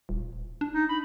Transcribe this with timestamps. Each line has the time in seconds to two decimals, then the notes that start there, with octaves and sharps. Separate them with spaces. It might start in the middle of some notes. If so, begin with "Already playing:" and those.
0.09 D#1
0.61 D4
0.75 D#4
0.89 B5